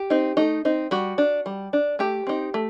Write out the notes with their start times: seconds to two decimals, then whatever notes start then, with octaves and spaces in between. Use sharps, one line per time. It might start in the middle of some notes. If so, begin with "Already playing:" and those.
Already playing: G4
0.10 C4 D#4
0.37 A3 D#4
0.65 C4 D#4
0.91 G3 F#4
1.18 D4
1.46 G3
1.73 D4
1.99 A3 G4
2.27 C4 D#4
2.54 A3